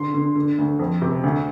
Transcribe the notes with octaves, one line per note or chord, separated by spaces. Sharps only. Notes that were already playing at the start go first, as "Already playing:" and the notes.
Already playing: D3 C6
D3
D3
D2
F2
C3
D2